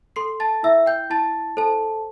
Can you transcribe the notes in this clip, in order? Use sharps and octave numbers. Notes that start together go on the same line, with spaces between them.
A4 C6 C7
A5 A6
E4 E5 E6
G5 G6
E4 A5 A6
A4 C5 A5